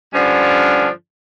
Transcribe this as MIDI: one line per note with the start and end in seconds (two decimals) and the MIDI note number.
0.13 0.88 43
0.13 0.88 50
0.13 0.88 53
0.13 0.88 61
0.13 0.88 62